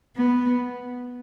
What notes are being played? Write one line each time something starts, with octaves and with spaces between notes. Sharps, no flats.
B3